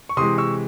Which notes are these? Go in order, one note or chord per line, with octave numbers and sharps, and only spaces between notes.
C#6
C3 E3 G#3 C6 D#6
C#6 E6